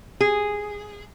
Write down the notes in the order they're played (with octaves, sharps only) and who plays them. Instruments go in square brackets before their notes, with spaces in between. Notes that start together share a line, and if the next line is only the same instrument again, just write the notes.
[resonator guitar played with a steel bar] G#4